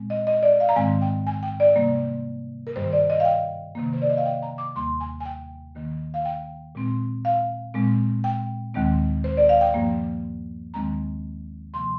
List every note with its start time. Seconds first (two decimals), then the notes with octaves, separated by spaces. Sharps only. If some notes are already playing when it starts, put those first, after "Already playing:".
Already playing: A#2 G#3 C4
0.10 D#5
0.27 D#5
0.43 D5
0.60 F5
0.69 A#5
0.76 G#2 D#3 G#3 C4 G#5
1.01 G5
1.27 G#5
1.43 G5
1.60 D5
1.76 C3 G3 A#3
2.67 A#4
2.76 G2 D#3 G3 C5
2.92 D5
3.10 D#5
3.20 F5
3.25 G5
3.75 C3 D#3 A#3
3.93 C5
4.02 D5
4.09 D#5
4.17 F5
4.25 G5
4.42 A#5
4.58 D6
4.75 D#2 D#3 G3 A#3 C6
5.00 G#5
5.20 G#5
5.25 G5
5.75 D#2 D#3 A#3
6.14 F5
6.25 G5
6.75 A#2 G#3 C4
7.25 F5
7.74 A#2 G#3 C4
8.24 G5
8.74 D#2 D#3 G#3 C4
9.24 C5
9.37 D5
9.49 F5
9.61 G5
9.74 G2 F3 A#3
10.74 D#2 D#3 G#3 C4 A#5
11.73 F2 C3 F3 A#3 C6